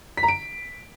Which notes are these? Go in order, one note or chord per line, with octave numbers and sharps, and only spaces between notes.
B6
A#5
D7